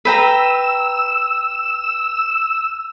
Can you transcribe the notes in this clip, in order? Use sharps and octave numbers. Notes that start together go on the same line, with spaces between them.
B4 G5 A#5 E6